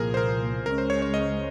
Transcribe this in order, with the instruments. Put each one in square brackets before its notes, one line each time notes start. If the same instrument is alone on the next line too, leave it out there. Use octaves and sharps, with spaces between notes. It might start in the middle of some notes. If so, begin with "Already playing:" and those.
Already playing: [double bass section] C2 A#2 F3 A#3 [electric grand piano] G#4 A#4
[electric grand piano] C5
A#4
[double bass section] C#2 C#3 G#3 C#4 [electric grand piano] A#4
[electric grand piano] C5
C#5
C#5
D#5